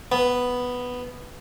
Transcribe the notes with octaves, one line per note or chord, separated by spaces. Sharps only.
B3